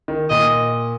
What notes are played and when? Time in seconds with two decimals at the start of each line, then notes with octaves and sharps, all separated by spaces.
0.08 D#3
0.30 A#2 D#5